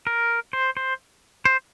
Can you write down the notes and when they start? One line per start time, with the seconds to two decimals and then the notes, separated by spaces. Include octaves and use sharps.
0.07 A#4
0.53 C5
0.77 C5
1.45 C5